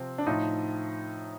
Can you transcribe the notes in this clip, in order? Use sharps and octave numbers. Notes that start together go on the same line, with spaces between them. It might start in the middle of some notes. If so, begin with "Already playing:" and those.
Already playing: C3 F3 C4
D4
A2 F3 D#4